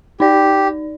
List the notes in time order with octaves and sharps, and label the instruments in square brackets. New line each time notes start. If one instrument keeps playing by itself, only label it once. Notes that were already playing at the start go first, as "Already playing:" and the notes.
[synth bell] D#4 D5 [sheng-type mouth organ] G4